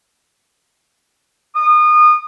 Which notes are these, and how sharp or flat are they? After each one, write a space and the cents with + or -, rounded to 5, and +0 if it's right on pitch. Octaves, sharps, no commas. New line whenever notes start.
D#6 -30